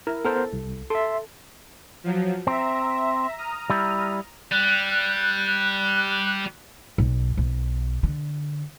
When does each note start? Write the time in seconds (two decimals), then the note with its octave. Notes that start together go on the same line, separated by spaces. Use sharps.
0.07 E4 A#4
0.24 B3 A4 A#4 C5
0.53 C2
0.90 A4 E5 C6
2.04 F3 F#3
2.47 C4 E5 A#5
3.37 A#5 D#6 F6
3.70 G3 E4
4.51 G3 F#6
6.98 B1
7.37 B1
8.03 D3